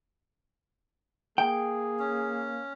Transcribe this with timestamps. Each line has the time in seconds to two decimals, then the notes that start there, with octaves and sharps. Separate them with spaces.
1.38 A#3 G#4 G5
1.99 C#4